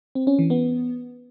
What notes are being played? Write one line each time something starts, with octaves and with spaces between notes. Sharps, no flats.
C4
C#4
E3
B3